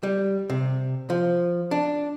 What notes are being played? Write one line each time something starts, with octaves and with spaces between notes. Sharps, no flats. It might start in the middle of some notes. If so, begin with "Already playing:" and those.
G3
C3
F3
D4